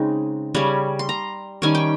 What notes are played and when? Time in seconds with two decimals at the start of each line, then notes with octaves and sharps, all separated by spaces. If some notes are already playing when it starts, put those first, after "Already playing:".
Already playing: C#3 G#3 C4 D#4
0.54 C#3 G3 C#4
0.99 C6
1.09 A#5
1.62 D#3 G3 C#4 G#5
1.75 G5